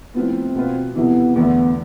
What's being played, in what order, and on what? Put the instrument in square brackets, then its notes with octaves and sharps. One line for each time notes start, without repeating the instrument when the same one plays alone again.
[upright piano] A2 F3 B3 [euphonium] C4
[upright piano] B2 B3 F4 B4
[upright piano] F2 C3 E3 [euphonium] B3
[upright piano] E2 D3 A3 [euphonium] B3